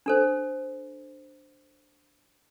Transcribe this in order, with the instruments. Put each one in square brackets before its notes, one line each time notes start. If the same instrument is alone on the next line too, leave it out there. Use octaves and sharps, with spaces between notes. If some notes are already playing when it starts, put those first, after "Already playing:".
[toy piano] D4 A4 C5